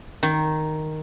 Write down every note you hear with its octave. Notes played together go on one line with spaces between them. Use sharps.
D#3